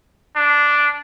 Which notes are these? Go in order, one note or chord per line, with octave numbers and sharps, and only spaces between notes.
D4